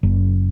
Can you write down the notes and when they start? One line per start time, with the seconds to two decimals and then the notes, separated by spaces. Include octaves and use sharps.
0.03 F#1